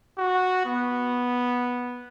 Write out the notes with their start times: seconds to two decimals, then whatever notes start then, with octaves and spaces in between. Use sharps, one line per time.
0.18 F#4
0.66 B3